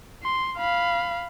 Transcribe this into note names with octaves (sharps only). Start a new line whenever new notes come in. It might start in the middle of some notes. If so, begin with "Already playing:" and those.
C6
F5 B5